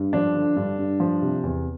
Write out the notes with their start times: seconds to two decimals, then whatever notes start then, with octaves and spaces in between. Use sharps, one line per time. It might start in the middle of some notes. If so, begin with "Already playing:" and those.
Already playing: G2
0.13 F3 D4
0.35 D3
0.56 G2
0.79 G2
1.00 F3
1.22 C3
1.43 E2